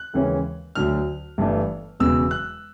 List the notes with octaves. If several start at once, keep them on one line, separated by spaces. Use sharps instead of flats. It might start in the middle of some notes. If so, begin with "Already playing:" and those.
Already playing: F#6
D#2 C#3 E3 G#3 C#4
D2 D3 F#3 F6
G1 G2 E3 A3 D4
E1 E2 C#3 F#3 B3 E6
F#6